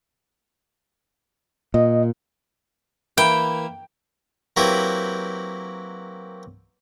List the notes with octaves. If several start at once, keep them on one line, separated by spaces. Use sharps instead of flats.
A#2 D#5
E3 A#3 E4 G5
F#3 A#3 C4 E4 G4 B4